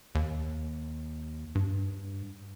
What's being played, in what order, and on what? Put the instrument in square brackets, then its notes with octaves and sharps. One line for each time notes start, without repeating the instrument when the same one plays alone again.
[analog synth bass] D#2
G2